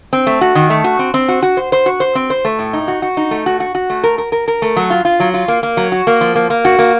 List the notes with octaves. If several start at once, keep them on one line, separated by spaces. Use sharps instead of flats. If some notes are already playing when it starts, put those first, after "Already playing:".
C4
A3
F#4
D#3
A3
F#4
C4
C4
F#4
F#4
C5
C5
F#4
C5
C4
C5
A3
A2
D#4
F#4
F#4
D#4
A3
F#4
F#4
F#4
A3
A#4
A#4
A#4
A#4
A3
F#3
F4
F4
F#3
F4
A#3
A#3
F#3
F#4
A#3
F3
A#3
A#3
F#4
A#3